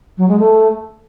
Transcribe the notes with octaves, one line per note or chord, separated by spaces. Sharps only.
F#3
G#3
A3